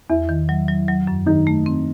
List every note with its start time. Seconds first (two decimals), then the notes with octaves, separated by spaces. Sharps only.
0.10 E2 E4
0.29 D#3
0.49 F#3
0.68 F#3
0.88 F#3
1.07 F#2
1.26 D#3 D#4
1.47 A3
1.66 C4